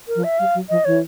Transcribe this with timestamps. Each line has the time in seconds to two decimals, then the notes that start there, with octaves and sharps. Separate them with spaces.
0.08 A#4
0.15 F3
0.24 E5
0.39 G3 F5
0.54 F#3
0.70 F3 D#5
0.85 E3 C#5